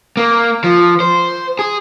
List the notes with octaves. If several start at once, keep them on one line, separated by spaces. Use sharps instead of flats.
A#3
F3
C5
G#4